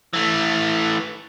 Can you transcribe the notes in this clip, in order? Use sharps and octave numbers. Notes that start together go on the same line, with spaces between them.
E3 A3